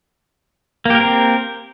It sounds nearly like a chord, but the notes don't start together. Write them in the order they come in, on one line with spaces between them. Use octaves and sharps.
A#3 G4 A#4 C4